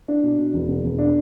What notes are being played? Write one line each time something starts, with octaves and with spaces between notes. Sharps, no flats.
D4
B2
B2
E1
E1
E1
D4